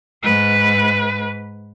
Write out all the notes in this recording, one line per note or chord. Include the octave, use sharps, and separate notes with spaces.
G#2 B4